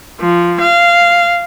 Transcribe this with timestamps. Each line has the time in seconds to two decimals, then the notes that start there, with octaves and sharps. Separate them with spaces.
0.20 F3
0.61 F5